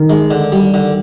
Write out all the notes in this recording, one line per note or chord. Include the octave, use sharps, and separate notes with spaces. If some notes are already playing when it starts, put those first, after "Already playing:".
Already playing: D#3
G#3
D3
G3
D3